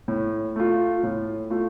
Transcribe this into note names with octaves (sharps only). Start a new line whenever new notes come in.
A2
A3 F4
A2
A3 F4